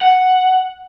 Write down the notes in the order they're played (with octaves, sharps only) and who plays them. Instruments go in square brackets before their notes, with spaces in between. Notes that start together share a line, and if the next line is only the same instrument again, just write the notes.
[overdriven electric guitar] F#5